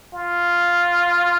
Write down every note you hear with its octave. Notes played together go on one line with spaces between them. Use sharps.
F4